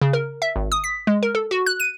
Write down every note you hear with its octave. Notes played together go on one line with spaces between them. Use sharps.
C#3
A#4
E5
G#1
D#6
B6
G#3
A#4
A4
F#4
F#6
D#7